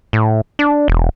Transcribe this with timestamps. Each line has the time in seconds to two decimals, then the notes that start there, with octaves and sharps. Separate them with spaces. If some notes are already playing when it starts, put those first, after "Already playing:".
0.13 A2
0.59 D4
0.88 E1